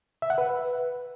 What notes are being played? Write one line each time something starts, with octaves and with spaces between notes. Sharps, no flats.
E5
F#5
B4